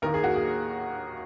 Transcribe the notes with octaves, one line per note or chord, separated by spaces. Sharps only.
D#2 D#3 A#3 A#4
G#4
F#4
G#4